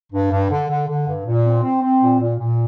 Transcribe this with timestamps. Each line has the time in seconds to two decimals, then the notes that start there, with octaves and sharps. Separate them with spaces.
0.12 G2
0.31 G2
0.50 D3
0.68 D3
0.88 D3
1.07 G2
1.25 A#2
1.45 C4
1.64 C4
1.82 C4
2.01 A#2
2.20 A#2
2.39 A#2